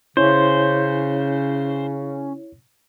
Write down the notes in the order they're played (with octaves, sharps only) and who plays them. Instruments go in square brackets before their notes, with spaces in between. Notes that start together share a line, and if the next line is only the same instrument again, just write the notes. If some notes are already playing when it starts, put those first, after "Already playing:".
[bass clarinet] C#3 [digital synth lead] C#4 [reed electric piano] E4 C#5 [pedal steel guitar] C5